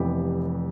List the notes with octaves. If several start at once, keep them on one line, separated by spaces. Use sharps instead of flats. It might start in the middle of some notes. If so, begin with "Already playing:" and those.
Already playing: F1 F2 E3 B3 G4